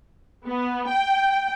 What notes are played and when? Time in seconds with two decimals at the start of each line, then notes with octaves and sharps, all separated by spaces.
0.46 B3
0.89 G5